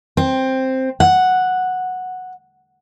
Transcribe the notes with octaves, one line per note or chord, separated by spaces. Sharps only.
C4
F#5